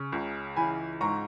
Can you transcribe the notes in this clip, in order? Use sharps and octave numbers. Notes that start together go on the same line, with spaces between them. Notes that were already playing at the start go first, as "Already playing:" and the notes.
Already playing: C#3 C#6
C#2
E3 G#5 B5
G#2 A#5 C#6